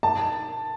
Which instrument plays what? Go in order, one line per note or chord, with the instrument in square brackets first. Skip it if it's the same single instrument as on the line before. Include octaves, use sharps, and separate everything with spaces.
[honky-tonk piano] A5